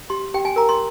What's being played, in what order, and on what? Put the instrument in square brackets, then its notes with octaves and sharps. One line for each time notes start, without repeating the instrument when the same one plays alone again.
[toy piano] G4 C6
G4 G5
G#5
A#4 A#5
C6